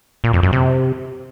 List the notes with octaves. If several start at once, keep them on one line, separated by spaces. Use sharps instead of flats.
A#2
F2
F#2
C3